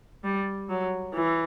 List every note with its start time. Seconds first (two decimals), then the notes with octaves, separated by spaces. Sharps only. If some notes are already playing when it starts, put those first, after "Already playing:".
0.24 G3
0.69 F#3
1.15 E3